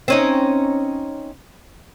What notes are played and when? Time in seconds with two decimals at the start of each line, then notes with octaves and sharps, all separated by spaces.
0.08 C4 C#4 D#4